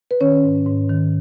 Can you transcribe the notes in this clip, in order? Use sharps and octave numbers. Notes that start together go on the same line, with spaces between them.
B4
D#3 C#4 C#5
G#2
G#2
D#3